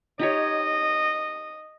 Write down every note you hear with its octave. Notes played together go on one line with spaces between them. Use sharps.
D#4 G4 C#5 D#5